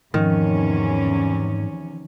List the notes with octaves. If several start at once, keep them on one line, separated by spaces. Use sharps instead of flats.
E2 G#2 C3 D#3 F3 C#4